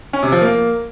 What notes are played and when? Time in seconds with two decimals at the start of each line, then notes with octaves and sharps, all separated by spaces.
0.13 C#4
0.23 C3
0.32 F3
0.42 A#3